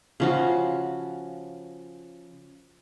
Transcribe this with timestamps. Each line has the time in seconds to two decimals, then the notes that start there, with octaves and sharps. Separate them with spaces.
0.20 C#3 F3 F#4